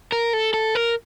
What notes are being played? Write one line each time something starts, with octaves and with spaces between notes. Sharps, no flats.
A#4
A4
A4
A#4